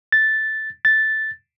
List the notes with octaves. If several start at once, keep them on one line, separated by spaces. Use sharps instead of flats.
A6
A6